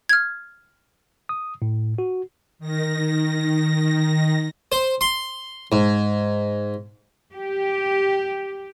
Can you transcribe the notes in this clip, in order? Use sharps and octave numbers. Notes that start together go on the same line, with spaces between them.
F6 G#6
D#6
A2
F#4
D#3 A#6
C5
C6
G#2
G4